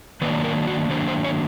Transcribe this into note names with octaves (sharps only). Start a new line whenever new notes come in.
D#3 F#3 A#3 D4 B4
A#4
F#4
D#3 F#3 A#3 D4 C5
C5
C#5